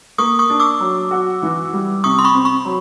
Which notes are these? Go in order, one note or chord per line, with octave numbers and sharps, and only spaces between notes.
A#3 C#6 D#6
C#6 D#6
D4
D6 E6
F#3
F#4
E3
G3
C3 C#6 D#6
C6
B5 C#6
C4
B5 C#6
F#3